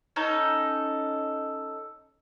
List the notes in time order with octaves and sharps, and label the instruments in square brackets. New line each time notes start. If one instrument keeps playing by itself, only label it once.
[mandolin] C#4 D#4 A4